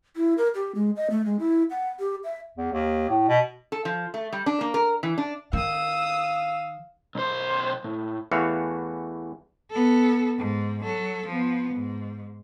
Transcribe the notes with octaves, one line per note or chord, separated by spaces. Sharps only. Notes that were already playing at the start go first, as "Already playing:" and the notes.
E4
A#4
G4
G#3
D#5
A3
G#3
E4
F#5
G4
E5
E2
D#2
A2
B2
A4
F3
A3
G3
D4
A#3
A#4
E3
D4
D#3 F5 D#6 E6
B1 C5
A2
E2 E3 A3 F#4 C#5 F5
B3 A4
G#2
F#3 A4
F3 B3
G#2